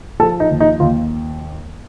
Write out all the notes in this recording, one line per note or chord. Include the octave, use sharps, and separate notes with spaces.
F3 A4
D#4
D#2
D#4
D#2 F4